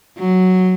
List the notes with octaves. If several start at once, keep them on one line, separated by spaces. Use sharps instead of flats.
F#3